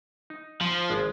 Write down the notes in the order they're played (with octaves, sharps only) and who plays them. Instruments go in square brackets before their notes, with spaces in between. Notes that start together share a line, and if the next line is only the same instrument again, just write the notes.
[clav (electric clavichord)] D#4
[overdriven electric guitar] F3
[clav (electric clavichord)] G#1 G#3 D5